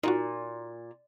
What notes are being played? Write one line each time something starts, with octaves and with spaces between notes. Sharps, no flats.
A#2 D#4 F4 F#4